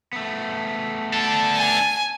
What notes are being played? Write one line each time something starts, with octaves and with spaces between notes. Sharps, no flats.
A3 B3
D4 A4 A5
G#5